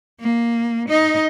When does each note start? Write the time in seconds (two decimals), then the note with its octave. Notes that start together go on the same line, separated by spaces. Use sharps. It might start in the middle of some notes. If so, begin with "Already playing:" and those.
0.20 A#3
0.89 D#4 D#5